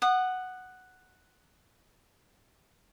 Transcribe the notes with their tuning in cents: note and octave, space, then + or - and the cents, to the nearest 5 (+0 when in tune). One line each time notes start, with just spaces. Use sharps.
F#5 +0 D#6 -25